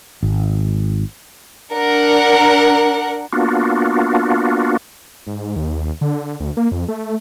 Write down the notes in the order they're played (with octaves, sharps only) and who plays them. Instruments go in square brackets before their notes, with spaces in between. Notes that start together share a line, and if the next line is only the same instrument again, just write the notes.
[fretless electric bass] G#1
[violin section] D4 A#4 F#5
[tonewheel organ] A#3 B3 D4 F4 F#4
[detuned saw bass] G#2
D#2
D3
D2
A#3
F2
A3